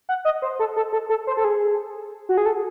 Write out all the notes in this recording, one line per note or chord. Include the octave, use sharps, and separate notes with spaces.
F#5
D#5
C5
A4
A4
A4
A4
C5
A4
G#4
F#4
G#4
A4